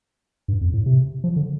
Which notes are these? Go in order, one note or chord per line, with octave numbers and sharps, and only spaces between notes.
G2
F2
A2
C3
F3
D3